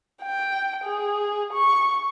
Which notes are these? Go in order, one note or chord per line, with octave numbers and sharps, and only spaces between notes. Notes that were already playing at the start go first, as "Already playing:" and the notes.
G5
G#4
C#6